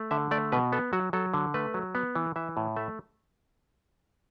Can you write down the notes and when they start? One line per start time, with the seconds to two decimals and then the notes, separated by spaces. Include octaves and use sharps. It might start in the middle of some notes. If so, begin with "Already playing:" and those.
Already playing: A3
0.11 D3 E5
0.31 A3 D5
0.52 B2 B4
0.72 B3 A4
0.93 F#3 F#4
1.13 F#3 A4
1.34 D3
1.54 A3 B4
1.74 F#3
1.95 B3
2.15 E3
2.36 E3 E5
2.57 A2
2.76 A3 E5